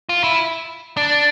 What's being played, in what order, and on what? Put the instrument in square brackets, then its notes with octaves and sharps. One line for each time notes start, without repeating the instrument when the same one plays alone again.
[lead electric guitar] F4
E4
D4